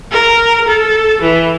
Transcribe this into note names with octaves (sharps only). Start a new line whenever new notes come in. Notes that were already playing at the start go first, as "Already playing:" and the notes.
A#4
A4
E3